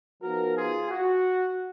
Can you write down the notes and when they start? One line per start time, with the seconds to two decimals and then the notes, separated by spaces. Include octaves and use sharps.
0.22 F3 B3 D#4 F#4 A#4
0.56 F4 G#4
0.91 F#4